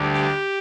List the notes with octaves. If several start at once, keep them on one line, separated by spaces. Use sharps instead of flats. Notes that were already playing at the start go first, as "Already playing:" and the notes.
Already playing: D2 D3 G3
G4